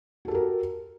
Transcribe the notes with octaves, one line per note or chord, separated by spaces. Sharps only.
F#4 G4 A4 A#4